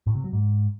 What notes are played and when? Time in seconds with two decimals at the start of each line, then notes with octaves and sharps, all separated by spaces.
0.07 A2
0.15 C3
0.24 F#3
0.33 G#2